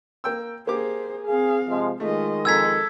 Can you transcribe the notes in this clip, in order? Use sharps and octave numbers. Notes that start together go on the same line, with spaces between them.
A#3 G5 E6
A#3 G4 G#4 C5 D6
C4 G#4 F5
C3 F3 G#3
D#3 G#3 A3 F4 D#5
F2 A4 G#5 A#5 E6 G#6 B6